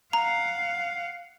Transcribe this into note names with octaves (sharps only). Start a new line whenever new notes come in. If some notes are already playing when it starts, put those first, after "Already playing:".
F5 F#5 A#5